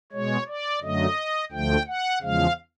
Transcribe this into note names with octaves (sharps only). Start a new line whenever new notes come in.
B2 G#3 C#5
D5
F#2 D3 F#3 A3 D#5
D2 D3 F3 A3 G5
F#5
E2 C#3 F3 G#3 F5